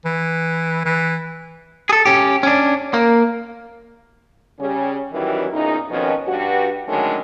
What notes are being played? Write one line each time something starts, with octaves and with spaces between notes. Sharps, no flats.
E3
E3
G#4 A4
C#4 G4
C#4 D4
A#3
C#3 G3 C#4
D#3 E3 F#3 G3 C#4 E4
E2 A#2 C#3 D#4
F2 B2 D#3 F3 C#4
G2 F#4
D3 D#3 F#3 G#3 A3 C#4